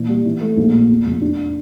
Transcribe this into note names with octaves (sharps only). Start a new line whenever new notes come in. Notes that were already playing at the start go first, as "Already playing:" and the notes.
Already playing: A#2 E3
G3
E3
A3
A#1
A#2
E2
F1
D4